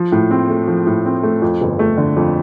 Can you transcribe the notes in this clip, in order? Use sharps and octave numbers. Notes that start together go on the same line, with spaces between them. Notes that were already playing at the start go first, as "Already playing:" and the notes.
Already playing: F3
A2
C4
A3
F3
A2
C4
A3
F2
G1
A3
D3
F2